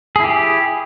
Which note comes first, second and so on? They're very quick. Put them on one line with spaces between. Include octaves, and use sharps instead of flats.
G#4 E4 G4